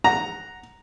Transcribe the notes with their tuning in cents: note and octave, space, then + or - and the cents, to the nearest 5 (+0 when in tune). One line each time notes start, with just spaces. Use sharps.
F#5 +0 A#5 +0